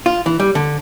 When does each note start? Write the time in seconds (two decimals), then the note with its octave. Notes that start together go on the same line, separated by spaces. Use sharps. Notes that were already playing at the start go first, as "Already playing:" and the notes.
0.06 F4
0.26 E3
0.40 G3
0.55 D3